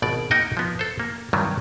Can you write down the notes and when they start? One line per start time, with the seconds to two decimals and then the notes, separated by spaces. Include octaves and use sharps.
0.02 G#1 B2 D5
0.31 A#3 D#4 F#4 D#5 G5
0.57 F3 B3
0.79 A4 C5
1.00 A#3
1.33 G2 C3 D#3 F#3 G3